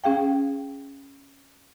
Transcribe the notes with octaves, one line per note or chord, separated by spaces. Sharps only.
C#4 G#4 F5 G5